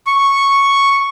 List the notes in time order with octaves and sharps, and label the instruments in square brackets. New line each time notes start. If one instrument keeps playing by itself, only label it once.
[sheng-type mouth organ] C#6